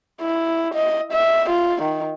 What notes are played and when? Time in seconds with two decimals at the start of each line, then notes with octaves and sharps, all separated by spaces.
0.21 E4
0.74 D#5
1.12 E5
1.50 F4
1.82 D#3